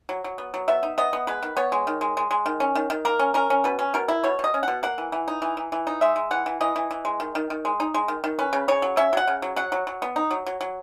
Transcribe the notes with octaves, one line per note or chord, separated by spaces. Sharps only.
F#3
F#3
B3
F#3
B3 E5
D#4
B3 D#5
B3
G#3 B4
D#3
B3 C#5
G#3
D#3
G#3
G#3
G#3
D#3
C#4
D#3
D#3
A#3 A#4
C#4
C#4 A#4
C#4
B2 B4
C#4
B2 A#4
E4
B2 C#5
B2 D#5
C#4
B2 F#5
A#3 F#5
E3
E3
D#4
E3
E3
E3
D#4
G#3 E5
G#3
E3 F#5
E3
E3 D#5
E3
E3
G#3
D#3
D#3
D#3
G#3
D#4
G#3
D#3
D#3
C#4 B4
C#3
C#3 C#5
F#3
C#4 E5
F#3 F#5
C#3
F#3
F#3 F#5
F#3
F#3
B3
D#4
F#3
F#3
F#3